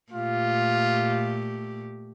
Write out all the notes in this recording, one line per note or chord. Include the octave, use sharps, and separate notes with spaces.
A#2 A3 F4 G4